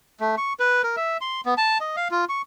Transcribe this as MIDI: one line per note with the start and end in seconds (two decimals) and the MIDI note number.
0.20 0.36 57
0.38 0.53 85
0.60 0.82 71
0.83 0.96 70
0.97 1.17 76
1.21 1.41 84
1.46 1.54 59
1.58 1.78 81
1.80 1.96 75
1.97 2.08 77
2.11 2.25 65
2.29 2.42 85